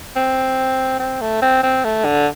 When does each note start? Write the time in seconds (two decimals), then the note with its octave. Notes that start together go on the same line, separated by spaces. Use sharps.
0.16 C4
0.99 C4
1.21 A3
1.42 C4
1.63 C4
1.85 A3
2.05 D3